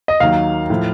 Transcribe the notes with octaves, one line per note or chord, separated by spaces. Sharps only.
D#5
D#2 D#3 F#3 F5
A2 F3